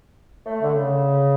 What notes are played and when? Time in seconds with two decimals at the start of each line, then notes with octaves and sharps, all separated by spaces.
0.46 A3
0.62 D3
0.74 C#3